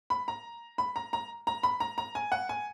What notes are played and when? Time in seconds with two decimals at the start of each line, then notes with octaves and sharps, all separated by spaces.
0.10 B5
0.28 A#5
0.78 B5
0.96 A#5
1.13 A#5
1.47 A#5
1.63 B5
1.80 A#5
1.98 A#5
2.15 G#5
2.32 F#5
2.49 G#5